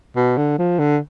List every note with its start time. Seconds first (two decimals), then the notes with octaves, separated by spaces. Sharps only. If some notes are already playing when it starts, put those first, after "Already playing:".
0.16 B2
0.37 D3
0.58 F3
0.79 D3